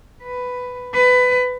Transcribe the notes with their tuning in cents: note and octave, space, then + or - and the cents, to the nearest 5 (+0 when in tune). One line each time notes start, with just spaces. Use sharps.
B4 +10
B4 +20